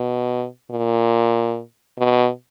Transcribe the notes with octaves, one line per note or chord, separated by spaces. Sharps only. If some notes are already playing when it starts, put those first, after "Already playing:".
Already playing: B2
A#2
B2